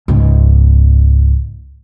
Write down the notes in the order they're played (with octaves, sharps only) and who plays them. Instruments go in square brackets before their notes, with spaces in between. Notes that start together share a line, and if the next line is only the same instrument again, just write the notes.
[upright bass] C#2 G#2